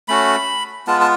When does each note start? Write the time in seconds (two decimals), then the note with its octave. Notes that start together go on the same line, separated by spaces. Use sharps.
0.08 A3 C#4 F#4 B5
0.87 G#3 B3 F4 A5
1.01 A5